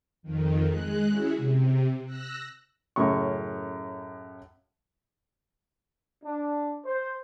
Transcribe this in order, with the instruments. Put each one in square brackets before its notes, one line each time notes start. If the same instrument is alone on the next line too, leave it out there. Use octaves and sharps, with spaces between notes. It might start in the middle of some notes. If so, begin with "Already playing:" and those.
[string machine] F2 D#3
G#3 F#6
C#4 E4 F#4 G#4
C3
E6 F#6 A#6
[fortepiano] F#2 A2 C#3 C#6
[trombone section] D4
C5